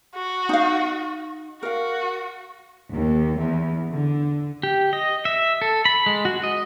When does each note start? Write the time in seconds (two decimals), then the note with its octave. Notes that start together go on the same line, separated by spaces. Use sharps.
0.16 F#4
0.49 D#4 F5
1.63 F#4 A#4 F5
2.92 D#2
3.39 E2
3.91 D3
4.63 G4
4.93 D#5
5.25 E5
5.62 A4
5.85 B5
6.06 G#3
6.25 F#4
6.44 D#5